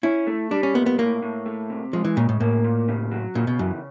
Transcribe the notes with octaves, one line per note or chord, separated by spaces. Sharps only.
C#4 E4
A3
G3 D4
C#4
A#2 B3
B3
A2 A#3
A2
A3
C3
F3 G#3
E3
A#2 C#3
A2
A2 A#3
A#2
C#3
F#3
A#2 C#3
B2
F#2 E3